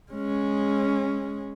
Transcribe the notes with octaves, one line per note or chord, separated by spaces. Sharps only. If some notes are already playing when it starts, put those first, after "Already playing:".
G#3 C#4